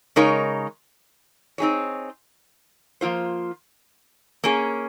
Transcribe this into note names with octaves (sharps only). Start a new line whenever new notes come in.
C#3 G#3 D#4 A#4 C#5
C4 D#4 G#4 C#5
F3 A#3 F4 C5
A#3 C#4 G#4